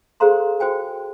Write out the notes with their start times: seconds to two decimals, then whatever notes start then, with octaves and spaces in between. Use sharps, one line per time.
0.20 G#4 A4 C5 F5 A#5 C6
0.60 F#4 C5 G5 G#5